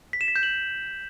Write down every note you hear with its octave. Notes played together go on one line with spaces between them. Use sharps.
B6
E7
B6
G6
F#7